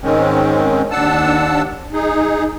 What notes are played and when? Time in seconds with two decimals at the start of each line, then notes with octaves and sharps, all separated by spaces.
0.01 G#2 D#3 G#3 C4 C#4
0.91 D#2 D4 F#5 A5 E6
1.93 D#4 G#4